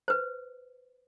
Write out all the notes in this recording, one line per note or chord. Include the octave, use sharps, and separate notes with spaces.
B4 C5